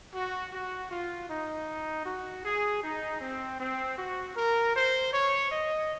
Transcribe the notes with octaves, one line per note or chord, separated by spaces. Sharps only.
F#4
F#4
F4
D#4
F#4
G#4
D#4
C4
C4
F#4
A#4
C5
C#5
D#5